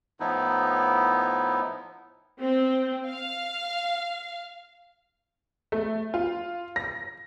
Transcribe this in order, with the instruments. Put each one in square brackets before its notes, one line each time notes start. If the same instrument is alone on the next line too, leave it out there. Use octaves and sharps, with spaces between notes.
[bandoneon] A2 F3 B3 D#4 E4
[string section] C4
F5
[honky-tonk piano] A3
F4
A#6